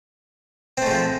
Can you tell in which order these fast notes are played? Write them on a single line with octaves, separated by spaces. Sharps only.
C4 A3 G#3 F3